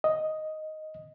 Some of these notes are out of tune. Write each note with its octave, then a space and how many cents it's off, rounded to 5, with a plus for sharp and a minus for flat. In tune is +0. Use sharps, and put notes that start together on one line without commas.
D#5 +5